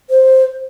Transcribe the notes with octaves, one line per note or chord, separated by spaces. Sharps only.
C5